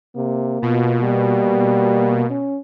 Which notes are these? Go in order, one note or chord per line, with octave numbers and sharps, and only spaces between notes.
C3 A#3
B2 F4
G3
C#4